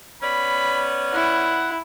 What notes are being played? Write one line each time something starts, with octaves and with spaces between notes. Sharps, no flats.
B3 C#4 D5 B5
E4 F#5